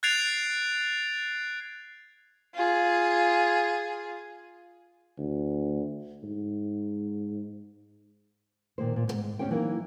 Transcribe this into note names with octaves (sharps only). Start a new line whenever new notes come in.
F#6 G#6 A6 C7 D7 F7
F4 G#4
D2
G#2
A#2 D#3 A#3 C5
A#2
D2 G#2
D2 G#2 C#4 G4 C5 G5
E3 F#3 A#3 D#4 A#4